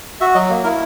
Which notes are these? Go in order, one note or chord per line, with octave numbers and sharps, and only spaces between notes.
F#4 E5
F#3 D#5
A#3
E4 A#4